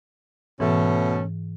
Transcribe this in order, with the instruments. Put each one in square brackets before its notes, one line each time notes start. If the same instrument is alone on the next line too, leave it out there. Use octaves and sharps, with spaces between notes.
[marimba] G#2 E3 [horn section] B2 A3 C#4